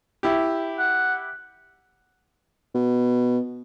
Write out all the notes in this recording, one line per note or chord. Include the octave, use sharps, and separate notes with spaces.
E4 G4
F#5
B2